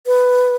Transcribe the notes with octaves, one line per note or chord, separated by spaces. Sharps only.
B4